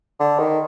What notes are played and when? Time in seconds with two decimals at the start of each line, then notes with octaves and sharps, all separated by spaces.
0.20 D3
0.39 D#3